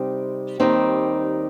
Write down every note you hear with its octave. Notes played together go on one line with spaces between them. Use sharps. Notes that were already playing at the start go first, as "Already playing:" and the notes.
Already playing: C3 G3 C4 D#4
D#2 D#3 G3 C4 D#4